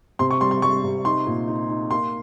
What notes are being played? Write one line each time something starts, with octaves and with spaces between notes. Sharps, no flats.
C3 C6
C#6
G3 C6
C6
G3 C#6
C3
D#4 C6
A#2
D#4
D#4
A#3 C6